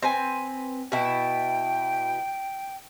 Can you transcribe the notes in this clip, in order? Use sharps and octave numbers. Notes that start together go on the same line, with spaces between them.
C4 B4 G#5
B2 E4 G5